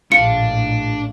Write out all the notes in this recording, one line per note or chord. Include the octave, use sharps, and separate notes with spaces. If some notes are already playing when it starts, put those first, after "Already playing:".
A#1 A2 D#3 D4 F4 C#7